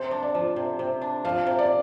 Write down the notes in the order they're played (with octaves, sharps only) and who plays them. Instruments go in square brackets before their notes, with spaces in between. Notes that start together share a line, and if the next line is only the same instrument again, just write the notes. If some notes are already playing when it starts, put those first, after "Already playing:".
Already playing: [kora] C3 [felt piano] C5
[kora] D4
[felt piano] D5
[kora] F3
C3
C3
D4
[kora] F3 [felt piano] F5
[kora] C3
[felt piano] D5